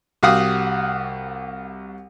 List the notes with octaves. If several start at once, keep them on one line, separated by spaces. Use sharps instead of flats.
C2 F#4 G4 F5 F#5 D#6